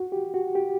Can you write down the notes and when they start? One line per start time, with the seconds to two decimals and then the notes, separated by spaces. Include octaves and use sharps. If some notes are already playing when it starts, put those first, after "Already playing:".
Already playing: F#4
0.12 G4
0.34 F#4
0.55 G4